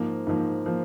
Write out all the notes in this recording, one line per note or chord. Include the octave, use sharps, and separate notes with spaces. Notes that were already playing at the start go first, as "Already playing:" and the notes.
Already playing: G#2 F3 A#3
G#2 F3 A#3
F3 A#3